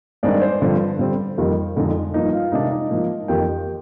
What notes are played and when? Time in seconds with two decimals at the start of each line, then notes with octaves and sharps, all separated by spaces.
0.23 G2 D#3 G#3 C4 D4 D#4 D5
0.42 C5
0.62 G2 D3 F3 C4
0.99 D3 G3 C4
1.37 F2 D#3 G3 A#3
1.76 F2 D3 G#3 D#4
2.14 G2 F3 A#3 D#4 D#5
2.33 F4 F5
2.52 C3 D#3 G#3 D4 D#4 D#5
2.71 D#4 D#5
2.90 G#2 F3 A#3 D#4
3.28 F2 D#3 A#3 G4 G5